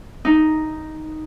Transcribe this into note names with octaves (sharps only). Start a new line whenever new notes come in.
D#4